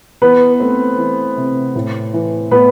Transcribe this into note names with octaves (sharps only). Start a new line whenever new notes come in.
E3 B3 B4
A3 C4 C5
E3
C3
A2
E3
A2 B3 B4